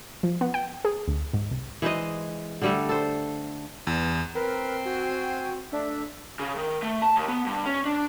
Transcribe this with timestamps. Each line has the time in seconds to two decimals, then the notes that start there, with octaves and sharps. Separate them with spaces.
0.23 F3
0.41 B3
0.54 G5
0.85 G#4
1.08 D2
1.34 G#2
1.51 C2
1.82 E3 G#3 C5 D#5
2.62 D3 G3 A3
2.89 A4 C5
3.87 E2
4.35 C4 A#4 B4
4.85 F#4 G5 G#5
5.72 A3 D4 E5
6.39 C#3
6.57 D#3
6.82 A3
7.02 A5
7.16 D#2
7.28 B3
7.46 G2
7.66 C#4
7.85 D4